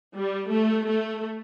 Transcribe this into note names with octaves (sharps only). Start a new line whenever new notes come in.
G3
A3
A3